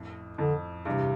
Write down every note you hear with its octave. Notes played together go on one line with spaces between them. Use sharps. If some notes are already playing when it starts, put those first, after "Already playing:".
Already playing: F2 A2
F2 D3
E2 G2 C3